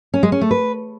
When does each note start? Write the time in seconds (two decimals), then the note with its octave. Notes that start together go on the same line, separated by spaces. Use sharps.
0.14 C#4
0.23 G#3
0.32 C#4
0.41 A3
0.51 B4